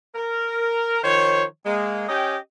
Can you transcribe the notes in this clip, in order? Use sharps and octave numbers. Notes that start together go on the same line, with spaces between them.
A#4
D#3 F3 C5 C#5
G#3 A#3
C#4 G4 D#5 G5